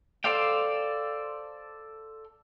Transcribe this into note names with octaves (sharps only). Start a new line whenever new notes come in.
A4 C5 D5 F5 G5